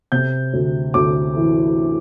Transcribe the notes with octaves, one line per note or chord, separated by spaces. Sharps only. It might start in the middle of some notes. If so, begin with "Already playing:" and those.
C3 G6
D2
D2 D6
E3